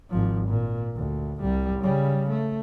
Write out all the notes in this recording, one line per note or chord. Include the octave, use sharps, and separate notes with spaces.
G#1 F3
A#2
D2
C2 G3
C#3 G3
A3